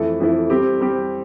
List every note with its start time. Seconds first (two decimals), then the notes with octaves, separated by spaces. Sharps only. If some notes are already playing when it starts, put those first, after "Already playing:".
Already playing: F2 E3 A3 E4 A4
0.20 F2 E3 A3 E4 A4
0.50 G3 C4 G4
0.81 G3 C4 G4